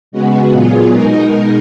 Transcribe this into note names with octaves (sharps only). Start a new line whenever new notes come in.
C#3 G#3 B3 F#4
A#2 F#3 B3 F4 G#4
B2 G#3 D#4 A#4